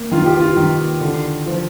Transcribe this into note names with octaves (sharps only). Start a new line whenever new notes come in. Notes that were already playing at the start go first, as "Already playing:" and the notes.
Already playing: A#3
D#3 F4
G4
F4
D#3
D3
F3